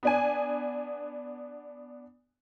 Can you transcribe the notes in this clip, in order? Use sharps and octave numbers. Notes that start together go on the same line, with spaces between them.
B3 D4 G#5